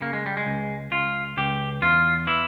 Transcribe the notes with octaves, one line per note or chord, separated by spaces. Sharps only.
C#3 A#3
G#3
G3
G#3
C#2
C#2 F4
C#2 G4
E2 F4
E3 E4